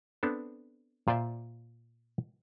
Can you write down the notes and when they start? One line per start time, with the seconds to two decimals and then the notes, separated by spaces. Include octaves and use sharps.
0.23 B3 C4 D4 A4
1.08 A#2 F4 C5 D5 E5